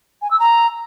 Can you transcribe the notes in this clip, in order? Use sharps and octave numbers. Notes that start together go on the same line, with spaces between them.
G#5
E6
A#5